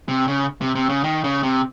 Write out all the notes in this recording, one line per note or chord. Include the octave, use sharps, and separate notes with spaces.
C3
C#3
C3
C3
C#3
D#3
C#3
C3